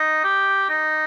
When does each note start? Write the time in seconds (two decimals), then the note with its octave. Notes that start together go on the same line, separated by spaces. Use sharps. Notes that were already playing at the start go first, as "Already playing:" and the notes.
Already playing: D#4
0.24 G4
0.69 D#4